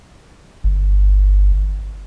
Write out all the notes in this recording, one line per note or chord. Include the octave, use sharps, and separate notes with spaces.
G1